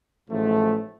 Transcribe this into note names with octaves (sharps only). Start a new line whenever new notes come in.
A1 G#2 F3 A3